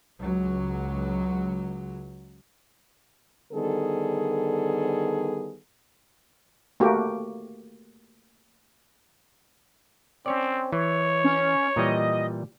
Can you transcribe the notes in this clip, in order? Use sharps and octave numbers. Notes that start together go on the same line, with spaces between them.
C#2 F#3
D3 D#3 G3 B3 G#4 A4
A3 A#3 F#4 G4
C4 C#4 C#5 D5
E3 C#5
C#4
A#2 E3 G3 D#5